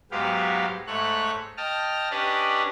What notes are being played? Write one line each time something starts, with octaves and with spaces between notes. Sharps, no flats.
G#2 F#3 G#3 B3 G4 F5
G#2 A3 C#5 F#6
D#5 G5 A5 F6
C#4 D4 G4 B4 D5 D#5